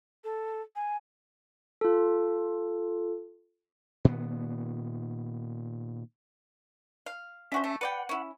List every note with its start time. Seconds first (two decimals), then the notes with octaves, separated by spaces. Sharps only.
0.24 A4
0.75 G#5
1.81 F4 A4
4.05 A#2 D#3 B3
7.06 F5
7.52 C#4 D4 F#4 C5 E5
7.64 A3
7.81 B4 D5 F#5 G5
8.09 C#4 E4